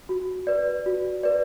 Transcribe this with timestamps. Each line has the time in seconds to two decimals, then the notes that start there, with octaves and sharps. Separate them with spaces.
0.09 F#4
0.47 B4 D5
0.86 F#4
1.23 B4 D5